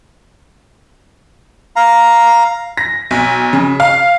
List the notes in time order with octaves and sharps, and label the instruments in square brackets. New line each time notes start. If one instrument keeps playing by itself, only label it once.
[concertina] F5 A#5
[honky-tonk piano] A#6
B1
C#3
F5